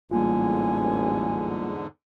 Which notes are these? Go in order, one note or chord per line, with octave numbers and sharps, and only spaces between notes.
A1 E2 G#2 D3 G3 A#3 F4 G#5